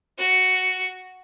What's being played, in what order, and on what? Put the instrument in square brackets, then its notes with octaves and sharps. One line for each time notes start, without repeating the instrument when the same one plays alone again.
[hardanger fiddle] F#4